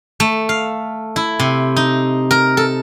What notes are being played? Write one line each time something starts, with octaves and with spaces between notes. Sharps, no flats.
A3
F5
E4
C3
D#4
A#4
A4